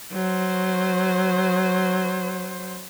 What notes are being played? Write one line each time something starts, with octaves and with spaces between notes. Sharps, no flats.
F#3 C5